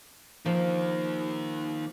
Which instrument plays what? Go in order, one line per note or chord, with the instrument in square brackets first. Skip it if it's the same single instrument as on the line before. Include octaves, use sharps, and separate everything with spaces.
[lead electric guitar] D#3 A#3 [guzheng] F3